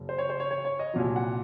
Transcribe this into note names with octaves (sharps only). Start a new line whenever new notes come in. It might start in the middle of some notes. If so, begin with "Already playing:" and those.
Already playing: F#1 F#2
C5
C#5
C5
C#5
C#5
C#5
D#5
C2 A#2 F#3
F#5